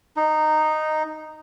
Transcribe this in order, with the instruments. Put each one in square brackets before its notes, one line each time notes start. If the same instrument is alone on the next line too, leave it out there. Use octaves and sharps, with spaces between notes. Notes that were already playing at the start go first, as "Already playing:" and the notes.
[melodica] D#4